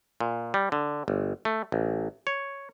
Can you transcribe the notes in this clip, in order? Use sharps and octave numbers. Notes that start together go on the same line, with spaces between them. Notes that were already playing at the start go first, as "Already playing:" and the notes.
A#2
G3
D3
G1
A3
A1
C#5